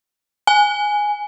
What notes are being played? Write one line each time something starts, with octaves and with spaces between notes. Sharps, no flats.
G#5